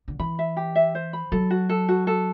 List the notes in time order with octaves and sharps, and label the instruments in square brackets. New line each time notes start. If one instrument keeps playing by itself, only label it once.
[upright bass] D3
[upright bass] E3 [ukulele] B5
[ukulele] E5
G4
E5
C5
B5
[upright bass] F#3 [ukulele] A4
[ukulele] F#4
A4
F#4
A4